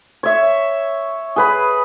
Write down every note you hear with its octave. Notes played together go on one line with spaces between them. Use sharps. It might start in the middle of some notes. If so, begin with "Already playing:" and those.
C#5 E5
G#4 B4 B5